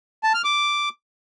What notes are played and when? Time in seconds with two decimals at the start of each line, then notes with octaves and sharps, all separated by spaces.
0.24 A5
0.34 F6
0.45 D6